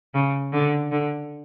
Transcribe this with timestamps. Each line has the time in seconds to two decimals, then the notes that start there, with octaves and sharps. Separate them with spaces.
0.15 C#3
0.53 D3
0.92 D3